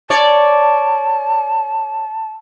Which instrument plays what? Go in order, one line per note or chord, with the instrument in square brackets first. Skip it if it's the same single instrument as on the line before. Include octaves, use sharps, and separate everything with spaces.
[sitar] C#5 D5 [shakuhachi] A5